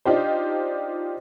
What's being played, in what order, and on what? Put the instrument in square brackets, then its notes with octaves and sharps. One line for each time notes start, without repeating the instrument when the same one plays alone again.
[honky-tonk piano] D4 D#4 F4 G4 C5